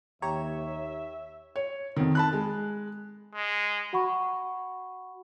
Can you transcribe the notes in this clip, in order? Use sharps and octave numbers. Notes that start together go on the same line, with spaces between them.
D#2 G4 C#5 E5 A#5
C#5
F2 D#3
A5 B5 F#6
G#3
G#3
F#4 F#5 B5 C#6